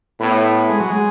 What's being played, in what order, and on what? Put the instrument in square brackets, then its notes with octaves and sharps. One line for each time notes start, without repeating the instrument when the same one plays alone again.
[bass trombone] A2 [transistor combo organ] B3
[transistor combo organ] G#3
F#3
G#3